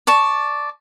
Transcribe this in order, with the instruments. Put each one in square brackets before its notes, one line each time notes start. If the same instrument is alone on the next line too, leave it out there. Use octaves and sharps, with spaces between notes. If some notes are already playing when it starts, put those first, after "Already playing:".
[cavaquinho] D5 A5 C#6